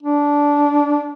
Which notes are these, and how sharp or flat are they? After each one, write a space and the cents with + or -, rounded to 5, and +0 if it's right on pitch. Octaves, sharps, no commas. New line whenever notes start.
D4 -15